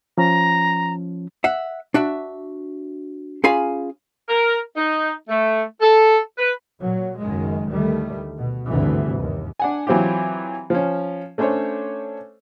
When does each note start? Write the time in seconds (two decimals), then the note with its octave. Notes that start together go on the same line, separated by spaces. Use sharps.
0.18 F3 C#4 A#5
1.44 E5 F#5
1.94 D4 F#4 E5
3.44 C#4 F4 G#4 F5 G#5 B5
4.29 A#4
4.77 D#4
5.29 A3
5.81 A4
6.38 B4
6.80 A#2 F#3
7.20 F#1 F#2 D#3 G#3
7.67 D2 D#3 G3 A3
8.37 B2
8.69 G#1 D2 G2 C3 E3
9.21 D#2
9.59 D4 F#5 G#5
9.87 E3 F#3 C4 F4 G4
10.70 F3 C#4
11.38 A3 C#4 D4 C5 C#5